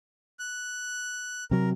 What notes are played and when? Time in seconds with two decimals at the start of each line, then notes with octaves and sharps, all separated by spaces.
0.39 F#6
1.51 C3 F#3 A#4